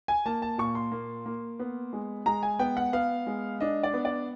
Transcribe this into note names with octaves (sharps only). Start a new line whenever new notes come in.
G#5
A#3 A5
A5
A#2 C#6
C6
A#3
A#3
B3
G#3
G#3 A#5
G#5
B3 G5
F#5
B3 F5
G#3
D4 D#5
D5
B3
D5